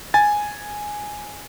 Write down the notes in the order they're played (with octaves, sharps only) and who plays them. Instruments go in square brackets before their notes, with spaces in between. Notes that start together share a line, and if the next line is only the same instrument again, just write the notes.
[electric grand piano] G#5 A6